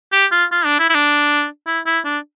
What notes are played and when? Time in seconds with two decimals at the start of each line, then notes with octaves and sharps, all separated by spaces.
0.12 G4
0.31 F4
0.51 F4
0.65 D4
0.79 E4
0.90 E4
0.95 D4
1.66 E4
1.86 E4
2.04 D4